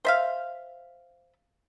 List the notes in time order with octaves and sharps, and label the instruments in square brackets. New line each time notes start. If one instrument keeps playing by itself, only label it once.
[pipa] C5 E5 F5